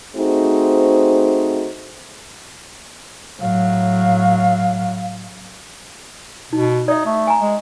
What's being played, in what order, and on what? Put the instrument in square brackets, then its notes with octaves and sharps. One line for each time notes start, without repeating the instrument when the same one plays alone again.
[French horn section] A3 C4 D#4 F#4 G#4 C5
[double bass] A2 F#3 [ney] F5
[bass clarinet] B2 [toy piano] D#4
[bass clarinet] D#4 [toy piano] D5 E5
[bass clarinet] A3
[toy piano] G#5 A#5
[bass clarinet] G#3